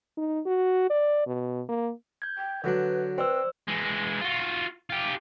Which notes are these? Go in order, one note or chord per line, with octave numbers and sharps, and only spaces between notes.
D#4
F#4
D5
B2
A#3
G6 G#6
G5
D3 F#3 D4 B4
C4 B4 C5 D5 E6
E3 G#3
F4 F#4
F4 G4